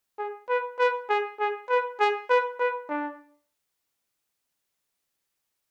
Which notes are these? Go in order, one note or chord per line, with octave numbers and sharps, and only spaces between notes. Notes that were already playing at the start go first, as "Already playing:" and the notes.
G#4
B4
B4
G#4
G#4
B4
G#4
B4
B4
D4